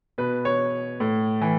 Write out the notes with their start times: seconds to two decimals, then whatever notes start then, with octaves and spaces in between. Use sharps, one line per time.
0.18 B2 B4
0.45 C#5
1.00 A2
1.41 E3